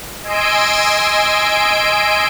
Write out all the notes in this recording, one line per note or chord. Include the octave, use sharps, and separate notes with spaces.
D#5 G#5 C6 E6 D7